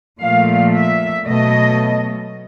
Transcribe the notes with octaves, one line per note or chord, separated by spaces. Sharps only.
A#2 F3 A3 F5
E5
B2 F#3 A3 D#5